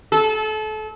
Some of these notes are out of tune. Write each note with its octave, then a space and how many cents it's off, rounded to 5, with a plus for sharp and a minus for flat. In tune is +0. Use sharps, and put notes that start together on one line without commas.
A4 -30